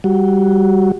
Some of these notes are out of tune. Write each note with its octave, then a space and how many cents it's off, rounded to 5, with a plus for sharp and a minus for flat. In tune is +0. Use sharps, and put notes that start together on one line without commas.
G3 +0 F#4 +0